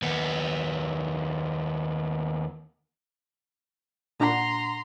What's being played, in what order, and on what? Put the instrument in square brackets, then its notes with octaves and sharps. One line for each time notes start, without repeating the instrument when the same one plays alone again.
[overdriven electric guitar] D#2 B3
[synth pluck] A#2 D4 F#5 [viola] A#5 C6